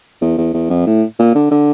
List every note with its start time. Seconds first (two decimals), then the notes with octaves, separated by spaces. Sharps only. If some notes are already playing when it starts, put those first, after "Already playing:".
0.22 E2
0.38 E2
0.54 E2
0.70 F2
0.86 A2
1.19 A#2
1.35 D3
1.51 D3